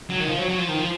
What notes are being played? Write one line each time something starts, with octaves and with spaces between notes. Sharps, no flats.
F#3
D#3
F3
F#3
F#3
F3
D#3
F3